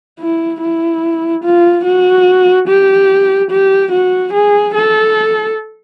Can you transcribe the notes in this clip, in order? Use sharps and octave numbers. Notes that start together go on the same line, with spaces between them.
E4
E4
F4
F#4
G4
G4
F#4
G#4
A4